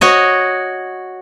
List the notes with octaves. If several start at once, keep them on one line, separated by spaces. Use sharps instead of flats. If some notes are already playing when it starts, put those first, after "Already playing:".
F#4 C#5 D#5